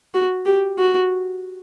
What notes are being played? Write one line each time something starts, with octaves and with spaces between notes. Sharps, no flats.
F#4
G4
F#4